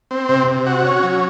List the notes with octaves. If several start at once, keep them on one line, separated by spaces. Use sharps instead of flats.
C4
C3
C3
F#4
C#4
F#3